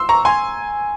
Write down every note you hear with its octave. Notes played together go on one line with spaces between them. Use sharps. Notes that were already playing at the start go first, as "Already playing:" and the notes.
Already playing: C6 E6
A#5 C#6
G#5 C6